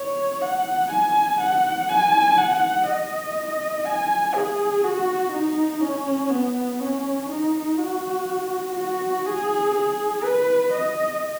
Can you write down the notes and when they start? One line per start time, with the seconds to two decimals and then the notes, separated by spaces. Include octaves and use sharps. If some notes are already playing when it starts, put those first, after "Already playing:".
Already playing: C#5
0.42 F#5
0.90 G#5
1.40 F#5
1.89 G#5
2.38 F#5
2.87 D#5
3.86 G#5
4.34 G#4
4.84 F#4
5.32 D#4
5.81 C#4
6.30 B3
6.80 C#4
7.29 D#4
7.78 F#4
8.75 F#4
9.26 G#4
9.74 G#4
10.24 B4
10.72 D#5